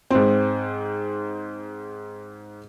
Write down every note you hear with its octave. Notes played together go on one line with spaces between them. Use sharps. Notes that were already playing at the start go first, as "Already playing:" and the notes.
G#2 C4